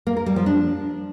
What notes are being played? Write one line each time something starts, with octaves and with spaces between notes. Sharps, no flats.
A#3
A#4
G3
F3
D4